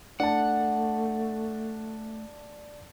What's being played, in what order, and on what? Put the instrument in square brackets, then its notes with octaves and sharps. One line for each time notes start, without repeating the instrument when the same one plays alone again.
[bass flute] A3 [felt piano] D4 A5 [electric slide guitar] F#5